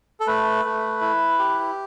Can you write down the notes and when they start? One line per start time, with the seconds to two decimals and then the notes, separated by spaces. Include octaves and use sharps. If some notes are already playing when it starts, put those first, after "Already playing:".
0.20 A4
0.27 A3 B4
0.65 A3
1.01 E4
1.39 G4